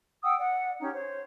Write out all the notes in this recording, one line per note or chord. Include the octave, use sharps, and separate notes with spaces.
F#5 G5 D#6 E6
D5 F#5
C#4 D#4 G4
C5 C#5